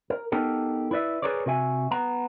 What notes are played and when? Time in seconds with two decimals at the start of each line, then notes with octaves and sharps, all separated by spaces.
0.10 A#4
0.32 B3 D#4 G4 A4 A#4
0.91 E4 B4 D5 E5
1.22 G#4 A#4 B4 C#5 D5
1.46 C3 F#4 E5 G#5
1.91 B3 A#5